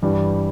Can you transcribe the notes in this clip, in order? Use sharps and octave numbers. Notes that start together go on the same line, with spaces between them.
G2 E3 G3